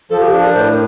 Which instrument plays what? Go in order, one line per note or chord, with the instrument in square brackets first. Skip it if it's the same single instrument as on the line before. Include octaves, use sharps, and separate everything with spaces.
[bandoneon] F3 [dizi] A4
[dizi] G4
[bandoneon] D4 [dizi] A4
[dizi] A#4
[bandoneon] A2 [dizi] C5
[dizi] A#4